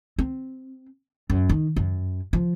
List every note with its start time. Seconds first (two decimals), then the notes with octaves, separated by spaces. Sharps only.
0.19 C4
1.30 F#2
1.50 D#3
1.76 F#2
2.33 F3